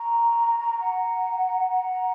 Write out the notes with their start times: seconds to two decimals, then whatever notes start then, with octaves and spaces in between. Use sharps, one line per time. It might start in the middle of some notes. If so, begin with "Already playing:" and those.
Already playing: A#5 C#6
0.80 F#5 A#5
1.69 F#5 A#5